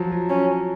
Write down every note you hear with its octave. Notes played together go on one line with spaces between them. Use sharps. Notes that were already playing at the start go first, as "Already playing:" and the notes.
Already playing: F3 F#3
F#3
C#4